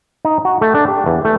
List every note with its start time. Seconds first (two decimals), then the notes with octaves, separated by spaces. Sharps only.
0.25 D#4
0.45 F#4
0.61 A3
0.74 D4
0.88 G4
1.06 E2
1.25 A3